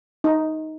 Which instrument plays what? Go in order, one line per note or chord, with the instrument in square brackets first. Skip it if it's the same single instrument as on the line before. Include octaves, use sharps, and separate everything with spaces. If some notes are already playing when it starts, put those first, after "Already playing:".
[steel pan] D#4